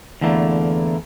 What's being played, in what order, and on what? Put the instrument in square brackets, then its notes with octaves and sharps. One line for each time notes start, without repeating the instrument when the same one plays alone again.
[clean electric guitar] E2 D3 E3 A3 A#3